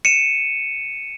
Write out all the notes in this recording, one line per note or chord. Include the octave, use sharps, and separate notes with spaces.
C#7 D#7 E7